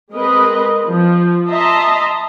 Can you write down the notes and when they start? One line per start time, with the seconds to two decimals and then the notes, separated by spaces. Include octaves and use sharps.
0.12 G#3 C4 A#4 B4 D#5
0.87 F3
1.50 D#5 E5 A5 A#5 C6